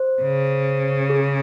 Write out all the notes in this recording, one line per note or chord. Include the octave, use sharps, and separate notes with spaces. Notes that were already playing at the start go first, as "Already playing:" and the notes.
Already playing: C5
C#3
G#4